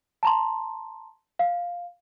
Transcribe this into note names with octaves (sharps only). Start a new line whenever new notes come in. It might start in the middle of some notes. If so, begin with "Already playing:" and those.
A5 A#5 C6
F5